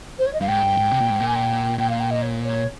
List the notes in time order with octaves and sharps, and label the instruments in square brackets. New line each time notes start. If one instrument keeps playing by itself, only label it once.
[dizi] C5
C#5
D#5
[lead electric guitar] G2 [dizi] F5
[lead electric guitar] G#2 [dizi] G5
[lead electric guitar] G2
G#2
C3
A#2
G#2
A#2
[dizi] G#5
G5
[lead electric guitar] A#2 [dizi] G5
[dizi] F5
G5
D#5
C#5
C#5